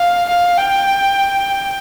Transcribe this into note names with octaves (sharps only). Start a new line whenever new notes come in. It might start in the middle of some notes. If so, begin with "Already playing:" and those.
Already playing: F5
F5
G5